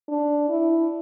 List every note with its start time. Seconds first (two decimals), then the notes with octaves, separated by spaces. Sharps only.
0.08 D4
0.49 E4